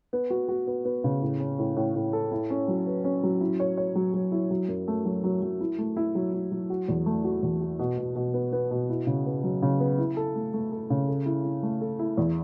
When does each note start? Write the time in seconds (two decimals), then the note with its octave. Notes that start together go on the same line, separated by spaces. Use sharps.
0.13 B3
0.30 F#4
0.49 F#4
0.67 B3
0.85 B3
1.04 C#3
1.22 A2
1.40 C#4
1.59 A2
1.76 A2
1.95 A2
2.13 A4
2.32 E4
2.50 C#4
2.68 F#3
2.86 B4
3.04 C#4
3.23 F#3
3.41 E4
3.60 C#5
3.77 C#5
3.95 F#3
4.14 F#3
4.32 E4
4.51 F#3
4.68 F#2
4.88 A3
5.05 F#3
5.24 F#3
5.42 F#3
5.61 E4
5.78 A3
5.97 E4
6.15 F#3
6.33 E4
6.52 F#3
6.70 F#4
6.88 E2
7.06 A3
7.24 F#4
7.43 E2
7.61 F#4
7.79 B2
7.98 B2
8.15 B2
8.34 B3
8.53 B3
8.71 B2
8.89 E4
9.07 C#3
9.26 B3
9.43 F#3
9.62 C#3
9.80 B3
9.98 E4
10.17 A4
10.35 A3
10.54 A3
10.72 A4
10.90 C#3
11.08 A4
11.26 E4
11.44 E4
11.63 A3
11.81 A4
11.99 E4
12.18 E2